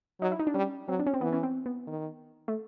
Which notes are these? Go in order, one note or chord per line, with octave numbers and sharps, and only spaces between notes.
F#3 D#4
E4
D#4
D4
G3 C#4
F#3 C4
D4
C#4
C4
E3 B3
C#4
C4
B3
D#3
A3